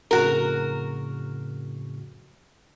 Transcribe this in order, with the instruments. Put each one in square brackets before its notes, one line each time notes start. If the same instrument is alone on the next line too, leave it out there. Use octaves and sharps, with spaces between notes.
[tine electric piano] F2 A2 C#3 [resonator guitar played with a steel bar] F#4 A#4